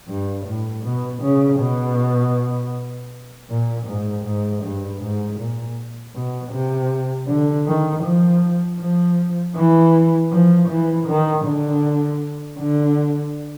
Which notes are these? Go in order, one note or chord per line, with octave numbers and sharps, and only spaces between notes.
G2
A2
B2
C#3
B2
A#2
G#2
G#2
G2
G#2
A#2
B2
C3
D3
D#3
F3
F3
E3
F3
E3
D#3
D3
D3